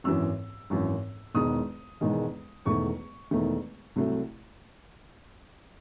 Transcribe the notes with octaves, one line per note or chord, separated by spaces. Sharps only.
G#1 F#2 E3 E6
G#1 F#2 E3
E1 E2 D#3 G#3 D#6
E1 E2 D#3 G#3
E1 E2 D#3 A3 C#6
E1 E2 D#3 A3
C2 C3 F#3 A3